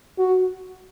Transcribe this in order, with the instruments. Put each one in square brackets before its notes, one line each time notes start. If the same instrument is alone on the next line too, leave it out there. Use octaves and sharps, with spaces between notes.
[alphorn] F#4